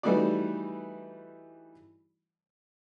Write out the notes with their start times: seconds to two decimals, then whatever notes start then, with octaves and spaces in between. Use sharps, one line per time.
0.03 E3 G3 A3 D#4 F#4 D5